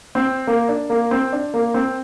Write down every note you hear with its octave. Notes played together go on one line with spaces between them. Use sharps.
C4
A#3
D4
A#3
C4
D4
A#3
C4